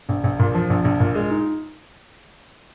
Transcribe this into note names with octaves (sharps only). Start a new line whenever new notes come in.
A#1
A#1
A#2
F3
A#1
A#1
A#2
G#3
D#4